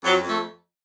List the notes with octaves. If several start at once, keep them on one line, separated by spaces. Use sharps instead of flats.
F2 F#3
F2
A3